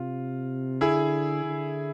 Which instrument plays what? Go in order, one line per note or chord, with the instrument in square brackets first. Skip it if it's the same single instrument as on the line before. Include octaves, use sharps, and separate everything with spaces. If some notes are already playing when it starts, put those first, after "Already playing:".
Already playing: [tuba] C3 [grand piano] F4
[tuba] D3 [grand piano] E4 G#4
[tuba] D3